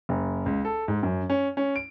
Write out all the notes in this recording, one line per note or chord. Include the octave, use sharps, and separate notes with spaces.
F#1
C#2
A4
G#2
F#2
C#4
C#4
D7